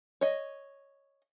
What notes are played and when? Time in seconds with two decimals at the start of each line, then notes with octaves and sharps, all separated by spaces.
0.21 C#5 D#5